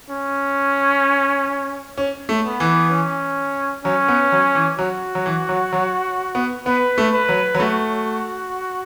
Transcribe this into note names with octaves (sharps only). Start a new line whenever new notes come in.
C#4
C#4
A3
B3
E3
C#4
F#3 C#4
B3
F#3
E3
F#3 F#4
F#3
E3
F#3
F#3
B3
B3 B4
A3
B4
F#3
F#3
A3 F#4